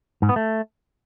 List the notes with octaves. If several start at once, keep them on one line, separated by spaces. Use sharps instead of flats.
G#2
B3
A3